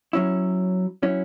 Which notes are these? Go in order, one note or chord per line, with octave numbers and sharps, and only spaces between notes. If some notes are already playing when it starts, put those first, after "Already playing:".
F#3 C#4 E4
F#3 C#4 E4